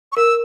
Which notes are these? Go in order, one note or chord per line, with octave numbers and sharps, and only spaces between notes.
C#6
A#4 E6